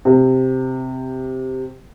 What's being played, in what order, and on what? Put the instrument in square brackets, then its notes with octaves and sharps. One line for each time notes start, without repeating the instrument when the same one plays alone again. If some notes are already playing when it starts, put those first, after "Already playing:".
[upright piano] C3